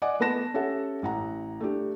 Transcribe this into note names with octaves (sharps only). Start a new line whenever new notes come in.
D5 D#5 F#5 G#5 D6
A3 B3 B4 A5 A#6 E7
C#4 G4 A4 E5 F#5
A1 F#5 A#5
A3 D4 G4